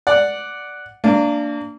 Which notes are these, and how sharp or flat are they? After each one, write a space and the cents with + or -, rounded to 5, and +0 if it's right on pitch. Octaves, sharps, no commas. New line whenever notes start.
D5 +0 F#5 +0
A#3 -25 D4 +0